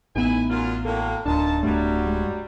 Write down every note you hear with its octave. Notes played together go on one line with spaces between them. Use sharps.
A1 B3 D#4 E4 B4 G#5
F#2 F4
A2 F#3 A#3 A4
D1 A#2 D4 D#4 A5
D1 G2 F#3 G3 A3
G#3